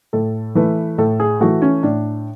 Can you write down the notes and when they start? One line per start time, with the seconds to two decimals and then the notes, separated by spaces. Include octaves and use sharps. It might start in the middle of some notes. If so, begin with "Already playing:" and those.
0.13 A2 A4
0.55 E3 A3 B4
0.98 A2 A4
1.20 G#4
1.41 E3 A3 F#4
1.62 C#4
1.83 A2 D4